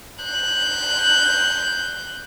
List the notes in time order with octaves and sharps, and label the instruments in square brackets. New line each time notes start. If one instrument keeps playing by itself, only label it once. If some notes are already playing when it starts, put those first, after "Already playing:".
[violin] F#6 G6